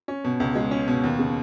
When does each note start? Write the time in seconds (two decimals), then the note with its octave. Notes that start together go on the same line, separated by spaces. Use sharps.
0.08 C#4
0.25 B2
0.40 C#2
0.55 G#3
0.71 C#4
0.88 B2
1.04 D#2
1.19 C#3